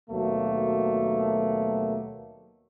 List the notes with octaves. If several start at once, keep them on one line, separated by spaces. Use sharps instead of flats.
D#2 B2 F#3 A3 A#3